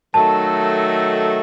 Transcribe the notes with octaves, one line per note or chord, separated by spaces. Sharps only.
D#3 F#3 A3 D#4 A4 A5